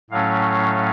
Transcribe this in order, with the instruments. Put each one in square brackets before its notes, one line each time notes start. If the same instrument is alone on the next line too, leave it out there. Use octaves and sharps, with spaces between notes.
[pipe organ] A2 F#3 A3 C#4 F5